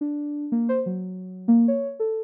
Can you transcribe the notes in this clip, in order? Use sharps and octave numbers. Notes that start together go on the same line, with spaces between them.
D4
A#3
C5
F#3
A#3
C#5
A4